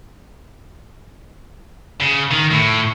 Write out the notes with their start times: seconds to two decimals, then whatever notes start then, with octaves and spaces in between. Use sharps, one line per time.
2.00 C#3
2.31 D#3
2.51 A2